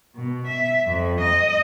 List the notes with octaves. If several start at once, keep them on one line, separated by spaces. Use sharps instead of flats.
B2
E5
F2
D#5